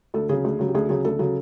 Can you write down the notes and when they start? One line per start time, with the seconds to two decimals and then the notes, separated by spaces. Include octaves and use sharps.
0.14 D2 A4
0.29 C#3 F#3 G#4
0.44 D2
0.59 C#3 F#3
0.68 G4
0.75 D2 G#4
0.89 C#3 F#3 G#4
1.05 D2 A4
1.19 C#3 F#3